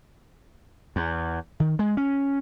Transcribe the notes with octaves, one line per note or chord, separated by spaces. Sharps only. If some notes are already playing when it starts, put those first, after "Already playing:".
E2
D#3
G#3
C#4